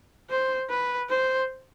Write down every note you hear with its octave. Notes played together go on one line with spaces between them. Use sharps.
C5
B4
C5